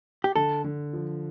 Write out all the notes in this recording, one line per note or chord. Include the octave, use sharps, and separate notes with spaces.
G4
D3 A4
D3
F3